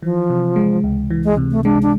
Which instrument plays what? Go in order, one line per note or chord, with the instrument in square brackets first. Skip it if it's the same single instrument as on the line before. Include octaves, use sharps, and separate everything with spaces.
[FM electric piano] E3 [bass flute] F3
[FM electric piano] C3
G#3
C#2
E3
[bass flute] G#3
[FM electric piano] C3
[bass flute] A3
[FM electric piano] G#3 [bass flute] D4
[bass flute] D4